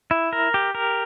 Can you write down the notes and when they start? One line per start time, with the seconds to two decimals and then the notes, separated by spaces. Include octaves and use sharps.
0.11 E4
0.33 A#4
0.54 G4
0.75 A#4